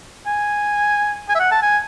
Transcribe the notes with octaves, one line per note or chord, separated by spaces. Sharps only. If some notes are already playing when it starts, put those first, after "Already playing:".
G#5
G#5
E5
F#5
A5
G#5